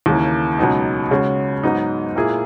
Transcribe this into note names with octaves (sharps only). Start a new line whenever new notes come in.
D#2 C#3 E3 A#3
C#2 B2 F#3 B3 D#4
C#3 G#3 C#4 F#4
G#2 F#3 B3 D#4
A#2 A#3 E4 G#4